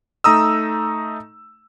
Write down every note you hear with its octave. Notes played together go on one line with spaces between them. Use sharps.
A3 D#4 A#5 D#6 E6